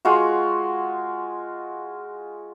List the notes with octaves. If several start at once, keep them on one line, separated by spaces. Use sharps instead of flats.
G#3 F4 F#4